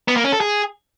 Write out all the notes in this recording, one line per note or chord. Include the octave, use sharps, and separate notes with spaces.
B3
A#3
C#4
A4
G#4